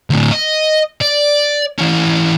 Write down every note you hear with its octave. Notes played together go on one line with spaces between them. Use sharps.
D2 A2
D#5
D5
E3 C#4